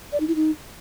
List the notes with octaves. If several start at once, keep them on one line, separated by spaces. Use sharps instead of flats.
D5
D#4
E4
D#4